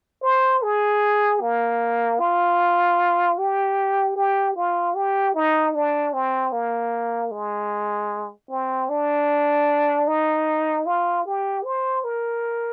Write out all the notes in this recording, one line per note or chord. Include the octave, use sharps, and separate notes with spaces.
C5
G#4
A#3
F4
G4
G4
F4
G4
D#4
D4
C4
A#3
G#3
C4
D4
D#4
F4
G4
C5
A#4